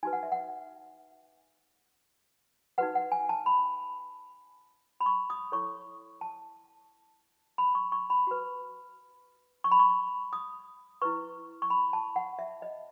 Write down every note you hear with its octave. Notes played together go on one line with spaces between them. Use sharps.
D#4 F#4 B4 G#5
F#5
E5
F#5
D#4 F#4 B4 F#5
F#5
G#5
A5
B5
B5
C#6
D#6
E4 A4 C#5 C#6
A5
B5
C#6
C#6
B5
F#4 B4
C#6
B5
C#6
D#6
E4 B4 C#6
C#6
B5
A5
F#5
E5
D#5